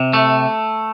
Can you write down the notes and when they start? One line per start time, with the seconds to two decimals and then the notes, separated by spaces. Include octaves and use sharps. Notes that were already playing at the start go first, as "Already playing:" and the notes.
Already playing: C3
0.13 A3